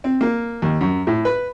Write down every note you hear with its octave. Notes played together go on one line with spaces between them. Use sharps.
C4
A#3
D#2
F#2
A2
B4